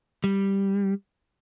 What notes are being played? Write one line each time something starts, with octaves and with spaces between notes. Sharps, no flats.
G3